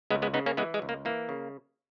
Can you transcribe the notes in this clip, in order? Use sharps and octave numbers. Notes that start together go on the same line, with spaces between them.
C#2 G#3 B3
G#3 B3
C#3 B3 D#4
A#3 C#4
E3 G#3 B3
G#3
C#2
A#3
E3 A#3
C#3